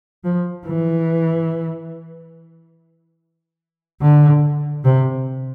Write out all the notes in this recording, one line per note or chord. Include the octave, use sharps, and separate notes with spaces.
F3
E3
D3
C3